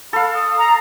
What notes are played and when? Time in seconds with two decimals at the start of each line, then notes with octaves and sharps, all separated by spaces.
0.13 A4 F5 B5
0.34 D#6
0.56 A#5